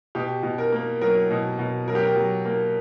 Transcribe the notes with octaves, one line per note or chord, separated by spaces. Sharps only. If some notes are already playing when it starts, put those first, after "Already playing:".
B2 G4
B2
A#4
A#3
F#3 A#4
B2
B2
F#3 A#4
G4
A#4
F#3
A#3